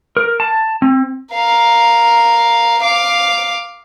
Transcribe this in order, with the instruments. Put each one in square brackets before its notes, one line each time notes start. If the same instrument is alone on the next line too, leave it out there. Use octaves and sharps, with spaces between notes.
[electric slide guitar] A#4
A5
C4
[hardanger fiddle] A#4 F5
F5 D6